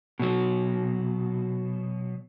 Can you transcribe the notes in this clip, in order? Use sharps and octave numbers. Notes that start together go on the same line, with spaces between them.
B2 F#3